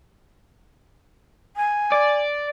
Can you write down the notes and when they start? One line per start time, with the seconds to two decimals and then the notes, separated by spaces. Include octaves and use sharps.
1.56 G#5
1.92 D5